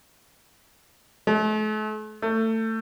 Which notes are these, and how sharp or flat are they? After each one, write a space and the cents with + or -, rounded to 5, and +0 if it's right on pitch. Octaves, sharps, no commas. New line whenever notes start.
A3 -40
A3 +25